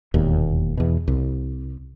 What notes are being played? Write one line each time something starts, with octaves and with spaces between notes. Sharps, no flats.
E1 D#2 A#2
E2 B2
C2